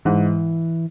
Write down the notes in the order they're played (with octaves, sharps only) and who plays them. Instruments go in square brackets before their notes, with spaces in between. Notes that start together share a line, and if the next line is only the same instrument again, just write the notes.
[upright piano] G#2 [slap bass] E3